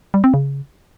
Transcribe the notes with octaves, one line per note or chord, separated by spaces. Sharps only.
G3
C4
C#3